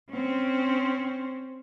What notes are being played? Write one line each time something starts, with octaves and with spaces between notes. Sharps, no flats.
C4 C#4